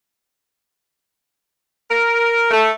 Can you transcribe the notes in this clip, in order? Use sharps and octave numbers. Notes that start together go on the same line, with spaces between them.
A#4
A3